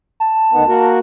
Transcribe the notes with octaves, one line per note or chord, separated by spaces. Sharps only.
A5
D2 D#3 B3
A#3 F#4 A#4